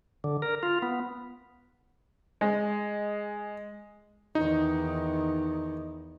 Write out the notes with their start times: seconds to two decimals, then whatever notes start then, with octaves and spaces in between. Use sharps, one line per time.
0.24 D3
0.42 A#4
0.63 F4
0.82 B3
2.41 G#3
4.35 E2 D#3 D#4